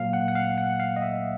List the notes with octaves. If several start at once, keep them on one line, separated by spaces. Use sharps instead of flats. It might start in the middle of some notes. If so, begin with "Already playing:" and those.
Already playing: A#2 F#3 A#3 F5
F#5
F#5
F5
F#5
F5
D#5
E5